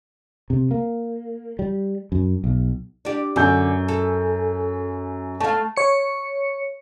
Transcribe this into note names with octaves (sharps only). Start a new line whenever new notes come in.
C3
A#3
G3
F#2
B1
D4 G4
F#2 D3 G#5 G6
A4
A3 F5 A5
C#5 C#7